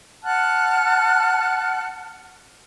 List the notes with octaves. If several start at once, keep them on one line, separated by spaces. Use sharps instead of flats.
F#5 A5 F6 F#6